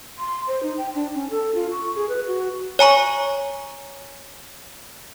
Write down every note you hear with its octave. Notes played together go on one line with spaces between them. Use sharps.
C6
C5
D#4
G5
D4
C#4
A4
F4
C#6
G#4
B4
F#4
C#5 G#5 A#5 C#6